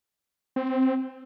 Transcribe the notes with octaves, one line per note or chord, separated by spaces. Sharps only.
C4